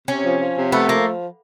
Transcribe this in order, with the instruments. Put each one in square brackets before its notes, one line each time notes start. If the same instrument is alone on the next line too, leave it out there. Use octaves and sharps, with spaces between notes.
[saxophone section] C3 [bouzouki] C#4
[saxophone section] F3
F3
C3
[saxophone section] A3 [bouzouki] B3
[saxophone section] F3 [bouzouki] A#3